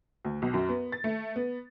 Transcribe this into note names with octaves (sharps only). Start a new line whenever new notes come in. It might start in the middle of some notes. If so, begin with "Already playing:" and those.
D2
B1
F#2
B3
A6
A3
B3